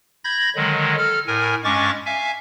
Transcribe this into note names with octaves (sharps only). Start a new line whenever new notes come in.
B5 G6 G#6 A#6
D3 D#3 F#3 G#3
A4 F6
A2 A#4 G#5
G2 G#3 C#4 C#6 D6 A6
E5 F5 G#5